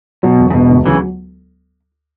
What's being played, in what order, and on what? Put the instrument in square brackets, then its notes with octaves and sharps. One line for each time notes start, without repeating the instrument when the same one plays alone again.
[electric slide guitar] B2 [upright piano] F#3
[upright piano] E1
[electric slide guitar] C#3
[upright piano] E1 [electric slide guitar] B2
[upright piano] D2
[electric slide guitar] C#3 E3 [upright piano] F#3